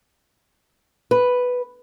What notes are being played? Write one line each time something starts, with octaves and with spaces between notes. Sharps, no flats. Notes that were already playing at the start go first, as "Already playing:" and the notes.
B4